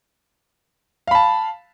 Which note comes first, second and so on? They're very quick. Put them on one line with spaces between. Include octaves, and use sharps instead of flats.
F5 B5 A5